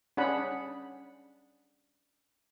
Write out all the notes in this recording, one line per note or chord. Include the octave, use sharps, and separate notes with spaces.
C#4 D4 G#4 F#5 B5